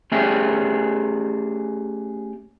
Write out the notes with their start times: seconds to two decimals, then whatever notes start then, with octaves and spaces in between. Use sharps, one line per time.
0.12 A3 C#4 G4 G#4 E5 G5